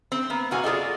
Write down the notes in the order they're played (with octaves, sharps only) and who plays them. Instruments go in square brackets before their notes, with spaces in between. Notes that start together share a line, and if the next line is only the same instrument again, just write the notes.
[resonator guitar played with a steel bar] C4
A#3 B3
F#2 C3 A#3 F#4 G#5
F4 G#4 A4 D5 D#5